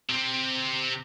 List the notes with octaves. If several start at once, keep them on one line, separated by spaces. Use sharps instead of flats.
C3 C4